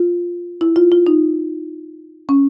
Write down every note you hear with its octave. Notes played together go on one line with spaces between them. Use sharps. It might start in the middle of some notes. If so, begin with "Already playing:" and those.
Already playing: F4
E4
F4
F4
D#4
C#4